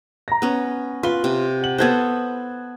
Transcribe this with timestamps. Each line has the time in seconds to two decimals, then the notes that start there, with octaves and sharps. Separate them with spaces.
0.28 A#5 A#6
0.42 B3 C#4
1.03 F4 B4 G7
1.24 C3
1.62 F#5 F#7
1.78 B3 A4 C5 F#6 G#6 A6